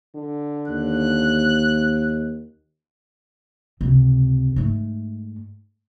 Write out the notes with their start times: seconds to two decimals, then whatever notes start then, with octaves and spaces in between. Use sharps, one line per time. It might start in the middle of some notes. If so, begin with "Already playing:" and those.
0.15 D3
0.68 D#2 F#6
3.81 C#2 C3
4.56 G#2 A3